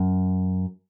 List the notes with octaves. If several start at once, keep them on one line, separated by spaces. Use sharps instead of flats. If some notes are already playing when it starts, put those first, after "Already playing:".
Already playing: F#2